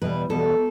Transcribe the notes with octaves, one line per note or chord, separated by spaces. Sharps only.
E2 B2 G3 B4
E2 B2 G3 A4